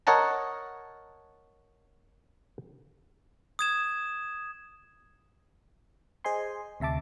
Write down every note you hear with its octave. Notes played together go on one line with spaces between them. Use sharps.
A#4 C#5 D#5 F#5 A5 A#5
D#6 G#6 E7
G#4 C5 D#5 G#5 C6
D2 C3 E5 A5 D6